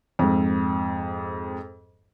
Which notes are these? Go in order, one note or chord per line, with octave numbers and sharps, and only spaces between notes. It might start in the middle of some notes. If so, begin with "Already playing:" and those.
F2 G#2